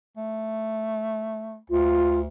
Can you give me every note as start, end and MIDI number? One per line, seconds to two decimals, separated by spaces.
0.17 1.57 57
1.70 2.27 38
1.70 2.19 65